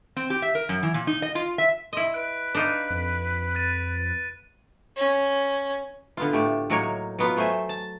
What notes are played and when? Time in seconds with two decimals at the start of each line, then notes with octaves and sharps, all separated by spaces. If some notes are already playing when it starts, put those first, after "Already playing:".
0.16 C4
0.30 G4
0.42 E5
0.55 A#4
0.69 F#2
0.83 E3
0.94 A#2
1.07 D#4
1.22 D#5
1.35 F4
1.58 E5
1.93 E4 D#5 C6
2.14 B4 F#6 D7
2.55 D4 D#4 F4
2.90 F2
3.55 F#6 A6 D#7
4.96 C#4
6.17 D3 B3 F4
6.33 A2 A3 G4
6.70 A2 F#3 A#3 D#4 A#4 C#5
7.18 F#3 B3 F4
7.36 F#3 A3 C5 E5 G#5
7.69 A5